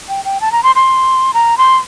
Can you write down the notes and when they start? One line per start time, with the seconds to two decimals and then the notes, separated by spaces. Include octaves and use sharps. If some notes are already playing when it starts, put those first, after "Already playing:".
0.09 G5
0.25 G5
0.41 A5
0.52 A#5
0.63 C6
0.76 C6
1.34 A#5
1.58 C6